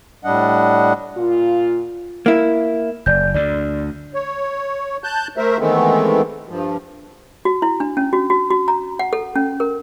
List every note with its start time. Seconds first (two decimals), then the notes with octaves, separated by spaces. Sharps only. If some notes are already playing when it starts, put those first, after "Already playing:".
0.25 A2 G3 D4 D#5 F#5
1.16 A#2 F4
2.26 A#3 E4
3.06 F#1 D5 G6
3.34 D2 D3 D5
4.14 C#5
5.04 A5 F#6 G6
5.37 A3 A#4 C5 E5
5.59 D#3 E3 G#3 A3 B3 C4
6.49 G2 F3
7.45 F#4
7.62 E4
7.80 D4
7.97 C#4
8.13 F#4
8.30 F#4
8.51 F#4
8.68 A#5
8.99 F#5
9.13 A4
9.36 C#4
9.60 A#4